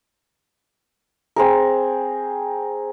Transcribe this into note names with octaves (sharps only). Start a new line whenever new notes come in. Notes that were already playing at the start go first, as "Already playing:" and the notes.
C4 G#4 A#4